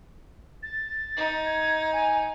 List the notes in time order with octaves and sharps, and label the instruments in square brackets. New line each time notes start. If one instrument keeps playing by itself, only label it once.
[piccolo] A6
[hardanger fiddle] D#4
[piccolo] G#6
G#5